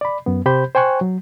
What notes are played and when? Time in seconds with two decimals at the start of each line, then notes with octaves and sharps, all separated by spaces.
0.01 D5 B5
0.26 F#2 B3
0.46 C3 G4 C5 B5 G6
0.75 C5 G5 G#5 C#6 F#6
1.01 F#3